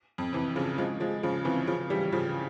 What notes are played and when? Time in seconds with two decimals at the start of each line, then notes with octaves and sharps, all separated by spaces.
0.18 F2
0.33 C3 E3
0.56 C#3 F3
0.78 F3 G#3
1.00 F3 G#3
1.23 C#3 F3
1.45 C3 E3
1.67 C#3 F3
1.90 E3 G3
2.12 C#3 F3